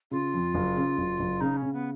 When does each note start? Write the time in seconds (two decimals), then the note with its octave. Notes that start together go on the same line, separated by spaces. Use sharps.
0.11 C#3 F4
0.34 F2
0.54 F#1
0.77 C#3
0.98 F#1
1.19 F#1
1.41 C#3 D#4
1.57 C#4
1.63 C#3
1.73 B3